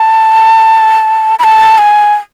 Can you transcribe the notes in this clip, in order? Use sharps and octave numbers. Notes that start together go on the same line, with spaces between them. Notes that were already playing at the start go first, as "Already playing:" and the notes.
Already playing: A5
B5
A5
G#5